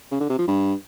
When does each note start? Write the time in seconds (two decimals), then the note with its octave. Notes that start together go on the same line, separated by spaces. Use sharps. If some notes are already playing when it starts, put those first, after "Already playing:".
0.11 C#3
0.20 D3
0.29 C3
0.38 F3
0.48 G2